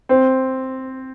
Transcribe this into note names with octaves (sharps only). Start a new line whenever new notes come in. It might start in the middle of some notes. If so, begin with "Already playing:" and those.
C4